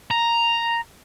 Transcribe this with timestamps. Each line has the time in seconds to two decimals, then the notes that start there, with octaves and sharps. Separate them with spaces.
0.11 A#5